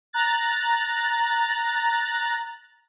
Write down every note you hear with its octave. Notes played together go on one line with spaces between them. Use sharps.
A#5 F#6 A6